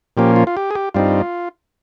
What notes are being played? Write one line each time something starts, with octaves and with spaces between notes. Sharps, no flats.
A#2 F3 A#3 C#4 G4
F4
F4
G4
G#4
G4
G2 G3 C4 D#4 F4